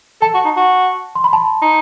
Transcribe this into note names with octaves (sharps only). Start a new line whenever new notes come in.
A4 A5
F#4
D#4
F#4
C6
B5
A5
B5
D#4